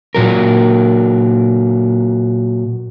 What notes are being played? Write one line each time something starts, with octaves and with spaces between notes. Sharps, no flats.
A#2 F#3 A#4